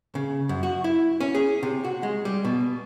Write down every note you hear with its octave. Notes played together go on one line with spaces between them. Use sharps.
C#3
F#2
F#4
E4
C#4
G#4
C3
F#4
G#3
G3
B2